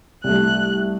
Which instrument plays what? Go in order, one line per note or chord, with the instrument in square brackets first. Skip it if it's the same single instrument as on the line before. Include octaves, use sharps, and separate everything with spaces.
[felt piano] C2 A3 [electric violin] F#6